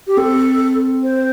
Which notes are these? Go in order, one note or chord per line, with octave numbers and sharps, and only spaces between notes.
G4
C4 A4
C5